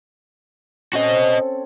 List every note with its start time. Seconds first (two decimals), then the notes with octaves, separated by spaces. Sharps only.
0.93 C4 C#4 F#4 A4 D#5